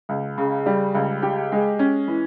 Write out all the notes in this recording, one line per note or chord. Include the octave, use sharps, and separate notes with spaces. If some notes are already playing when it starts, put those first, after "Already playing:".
C#2
C#3
G3
C#2
G4
G#3
C#4
E3